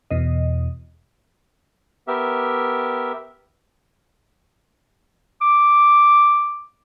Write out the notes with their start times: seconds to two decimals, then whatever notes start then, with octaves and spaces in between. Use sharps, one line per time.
0.11 E2 B2 D#5
2.08 B3 G4 A#4 E5
5.41 D6